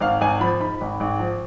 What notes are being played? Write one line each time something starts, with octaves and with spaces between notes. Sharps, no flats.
G#1 F5
G#1 G#5
F3 B5
G#2 B5
G#1
G#1
F3